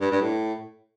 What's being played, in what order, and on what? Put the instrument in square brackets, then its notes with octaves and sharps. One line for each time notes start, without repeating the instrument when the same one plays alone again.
[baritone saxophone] G2
G2
A2